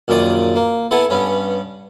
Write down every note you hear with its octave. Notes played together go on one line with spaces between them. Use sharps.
A#1 F#2 A#2 D#3 D5 D#6
A#3
B3 E4 A4 F#5 G#5
G2 B3 C#4